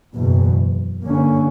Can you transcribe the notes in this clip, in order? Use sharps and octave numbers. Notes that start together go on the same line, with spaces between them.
F#1 E2 B2
G2 D3 A#3 C#4